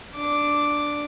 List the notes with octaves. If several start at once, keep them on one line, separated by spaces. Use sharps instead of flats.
D4 D6